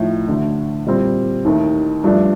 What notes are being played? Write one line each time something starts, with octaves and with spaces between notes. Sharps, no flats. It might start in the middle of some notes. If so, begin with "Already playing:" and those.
Already playing: A2 F3 A3 D#4
D2 D3 A3
A#2 G3 C4
D#2 D#3 A3
G2 F3 A3 D4